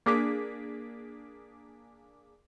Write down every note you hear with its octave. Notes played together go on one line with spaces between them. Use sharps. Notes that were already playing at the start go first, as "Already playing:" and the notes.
A#3 D4 G#4 D6 B6